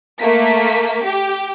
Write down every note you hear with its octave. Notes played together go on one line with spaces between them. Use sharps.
A3 A#3 B6
G4